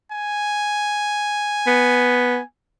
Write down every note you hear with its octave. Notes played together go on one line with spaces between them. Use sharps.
G#5
B3